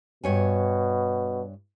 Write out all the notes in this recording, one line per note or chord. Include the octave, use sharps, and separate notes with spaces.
G2 B2 C#5 G#5